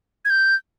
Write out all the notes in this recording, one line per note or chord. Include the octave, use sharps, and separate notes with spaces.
G#6
G6